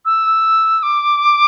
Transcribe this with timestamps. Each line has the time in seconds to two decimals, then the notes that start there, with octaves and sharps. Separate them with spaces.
0.05 E6
0.83 D6